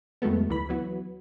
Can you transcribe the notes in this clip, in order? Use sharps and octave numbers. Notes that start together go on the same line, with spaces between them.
F2 D#3 F#3 G#3 A3 B3
D2 E3 B5
E3 F#3 B3